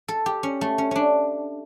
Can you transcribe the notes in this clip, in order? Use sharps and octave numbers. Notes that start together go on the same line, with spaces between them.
A4
G4
C#4
A3
C#4
C#4 D4